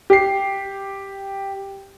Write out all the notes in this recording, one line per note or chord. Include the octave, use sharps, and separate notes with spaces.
G4 C7